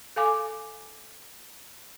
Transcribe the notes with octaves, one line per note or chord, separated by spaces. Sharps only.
A4 F5 G#5 D6